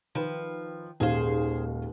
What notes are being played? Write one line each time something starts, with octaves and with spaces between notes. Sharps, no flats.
D#3 F3 B4
D#1 D#2 G#2 G#4 C5 F5